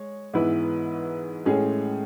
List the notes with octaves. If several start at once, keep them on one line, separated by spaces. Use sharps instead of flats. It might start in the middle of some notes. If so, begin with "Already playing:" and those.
Already playing: G#3 C#5
G#2 E3 B3 E4 B4
A2 G#3 C#4 G#4